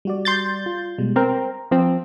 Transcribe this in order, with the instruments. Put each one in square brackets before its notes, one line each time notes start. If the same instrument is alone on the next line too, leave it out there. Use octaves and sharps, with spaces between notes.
[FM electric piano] G3 F#4 D5
[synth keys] C6 G6 A6
[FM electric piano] F4
B2 G3 G#3
[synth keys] C4 A#4 [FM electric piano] A#5
[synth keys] F3 C4